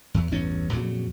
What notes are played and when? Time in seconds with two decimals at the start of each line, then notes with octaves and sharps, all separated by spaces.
0.14 E2
0.31 A1 E2 G2 C#4
0.73 F2 A#2 C#3 F#3